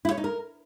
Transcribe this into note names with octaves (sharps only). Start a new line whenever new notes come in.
E4
C#5
D#4
A#4